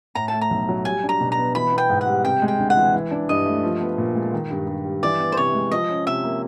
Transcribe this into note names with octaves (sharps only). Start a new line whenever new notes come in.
A2 A#5
A5
A3
A#5
B1
F#3
G3 G#5
D4
A#5
B2
A#5
B3
E3 B5
B3
G5
G#2
F#5
G3
C3 G5
G#3
G5
D2
F#5
E3
E3
D4
G2 D#5
A3
F3
B3
A#2
G#3
D#3
G2
G2
G3
E3 D5
B3
C5
C3 C#5
G#3
F3 D#5
C#4
C3 E5
A#3